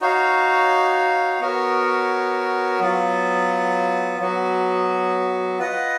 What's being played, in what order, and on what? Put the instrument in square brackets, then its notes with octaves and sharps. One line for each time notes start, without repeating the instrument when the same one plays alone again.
[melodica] D#4 F#4 C#5 F5
B3 F#4 A#4 C#5
F#3 B3 F4
F#3 B3 F#4
F4 B4 D#5 F#5